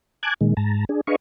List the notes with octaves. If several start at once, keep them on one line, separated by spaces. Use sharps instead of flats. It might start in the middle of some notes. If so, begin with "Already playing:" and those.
G#5 A5 D6 F#6 G#6
A#2 D#3 G#3
G#2 A5 A#5
D4 G#4
D4 G#4 B4 D#5 F5 C#6